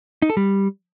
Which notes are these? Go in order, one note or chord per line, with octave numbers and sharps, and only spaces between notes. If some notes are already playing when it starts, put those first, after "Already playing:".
D#4
A4
G3